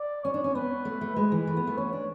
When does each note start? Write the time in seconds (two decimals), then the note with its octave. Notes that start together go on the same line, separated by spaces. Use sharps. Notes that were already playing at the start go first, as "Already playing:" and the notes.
Already playing: D5
0.24 C#4 C#5
0.34 D4
0.44 C#4
0.55 B3 B4
0.85 A3
1.01 A3
1.16 G#3 B4
1.32 E3
1.47 A3
1.57 B3
1.67 A3
1.77 C#4 C#5
1.93 D4